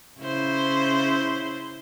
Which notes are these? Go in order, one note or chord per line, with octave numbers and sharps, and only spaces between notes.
C#3 E4 C5